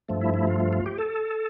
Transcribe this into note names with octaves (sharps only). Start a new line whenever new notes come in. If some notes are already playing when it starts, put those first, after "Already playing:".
G2 F3 A3
E4
E4
F4
F4
F4
G4
A4